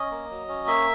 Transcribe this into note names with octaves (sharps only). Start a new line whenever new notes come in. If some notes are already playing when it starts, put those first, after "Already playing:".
Already playing: C#4 D#5
A#3
F#3
C#4
A#3 E5